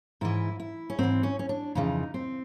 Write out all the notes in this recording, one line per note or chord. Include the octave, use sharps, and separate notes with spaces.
G#2 E3 E4
E4
C#4
G#2 E3 C4
C#4
C#4
D4
F2 C#3 E3 D#4
C4